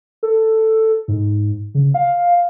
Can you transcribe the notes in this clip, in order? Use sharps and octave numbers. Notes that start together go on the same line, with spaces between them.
A4
G#2
C#3
F5